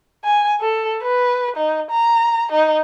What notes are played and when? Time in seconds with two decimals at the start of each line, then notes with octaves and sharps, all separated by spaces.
0.24 G#5
0.61 A4
1.02 B4
1.56 D#4
1.90 A#5
2.52 D#4